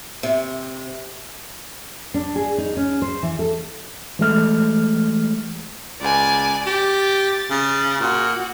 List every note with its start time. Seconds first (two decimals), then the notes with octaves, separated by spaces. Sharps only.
0.23 C3
2.14 D4
2.36 G#4
2.58 D#4
2.77 C#4
3.02 C5
3.23 E3
3.39 A4
4.19 E3 G#3 A3 F6
6.01 C#2 D5 G#5
6.66 G4 A6
7.50 C#3
8.00 A#2 F#4